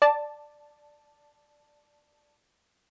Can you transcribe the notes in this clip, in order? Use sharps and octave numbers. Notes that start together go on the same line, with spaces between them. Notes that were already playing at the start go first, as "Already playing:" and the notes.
D5 A5